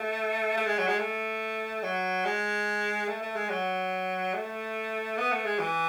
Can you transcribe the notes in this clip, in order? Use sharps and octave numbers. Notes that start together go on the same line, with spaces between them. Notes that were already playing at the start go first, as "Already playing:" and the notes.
Already playing: A3
A3
G#3
F#3
G#3
A3
F#3
G#3
A3
A3
G#3
F#3
A3
B3
A3
G#3
E3